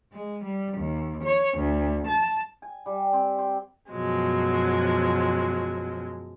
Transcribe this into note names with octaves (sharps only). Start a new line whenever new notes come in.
G#3
G3
D#2
C#5
D2
A5
G#5
G3
C4
C5
F#2 B2 F3 F#3 G#3